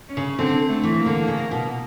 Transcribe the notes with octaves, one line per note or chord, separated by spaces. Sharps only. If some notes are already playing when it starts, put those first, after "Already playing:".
C#4
C#3
D3 C4
A3
E3
A#3
D3
C#3
B2